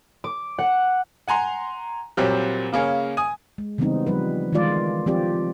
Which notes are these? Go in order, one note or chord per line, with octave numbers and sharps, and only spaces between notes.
D6
F#5
F#5 G#5 A#5 C6
A#2 F#3 G3 A#3 C4 G4
C#3 A#3 C#4 G#4
G#5 D#6
G#3
C#3 E3 G3 B3 C4 D#4
F3 G3 B4
D#3 E3 G#3 F4 D5
F3 C4 F4 G4 D5